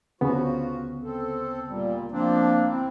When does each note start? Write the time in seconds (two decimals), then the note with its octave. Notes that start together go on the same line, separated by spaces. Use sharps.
0.21 D2 C#3 F3 B3 F#4
1.03 C4 A4
1.69 A#2 G3
2.12 F3 A#3 C4 D4
2.69 C4 E4